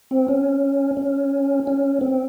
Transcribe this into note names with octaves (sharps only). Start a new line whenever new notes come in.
C4
C#4
C#4
C#4
C4